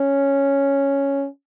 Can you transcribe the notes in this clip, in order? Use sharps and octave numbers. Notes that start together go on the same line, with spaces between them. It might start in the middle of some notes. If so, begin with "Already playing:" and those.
Already playing: C#4